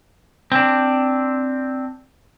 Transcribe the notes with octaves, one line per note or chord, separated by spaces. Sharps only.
C4 D4